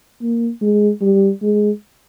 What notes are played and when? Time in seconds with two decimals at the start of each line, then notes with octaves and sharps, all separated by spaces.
0.22 A#3
0.62 G#3
1.01 G3
1.42 G#3